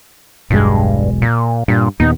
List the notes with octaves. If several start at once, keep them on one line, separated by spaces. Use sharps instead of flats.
E1 B1 G2 G#3
A#2
G2 A#2
D#2 A#2 B3 D#4